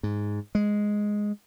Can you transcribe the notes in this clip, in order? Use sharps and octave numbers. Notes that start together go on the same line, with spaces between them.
G#2
G#3